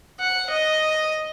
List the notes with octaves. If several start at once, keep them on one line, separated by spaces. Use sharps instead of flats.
F#5
D#5